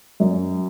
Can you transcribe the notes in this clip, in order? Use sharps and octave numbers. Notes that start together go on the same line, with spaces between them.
F#2